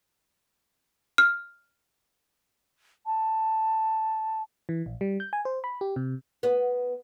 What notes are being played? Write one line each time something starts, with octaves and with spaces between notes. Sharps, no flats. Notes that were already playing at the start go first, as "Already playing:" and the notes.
F6
A5
E3
A#1
G3
G6
G#5
C5
B5
G4
C3
B3